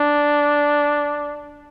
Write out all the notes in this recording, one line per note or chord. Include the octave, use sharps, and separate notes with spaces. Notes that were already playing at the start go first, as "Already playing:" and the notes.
Already playing: D4